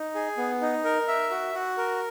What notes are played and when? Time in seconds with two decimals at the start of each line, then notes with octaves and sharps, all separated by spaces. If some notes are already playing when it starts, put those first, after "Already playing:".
Already playing: D#4
0.15 G#4
0.38 B3
0.62 D#4
0.84 A#4
1.08 E5
1.31 F#4
1.54 F#4
1.77 A#4